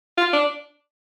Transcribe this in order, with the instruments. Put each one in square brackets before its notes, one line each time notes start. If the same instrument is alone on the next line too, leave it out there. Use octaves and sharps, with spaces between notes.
[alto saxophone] F4
D4